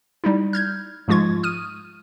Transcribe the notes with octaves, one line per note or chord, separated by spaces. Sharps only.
G3 D#4 E4
F6 G6 G#6
G#2 F3 G#3 F4 C#6 G#6
D#6 F6 D#7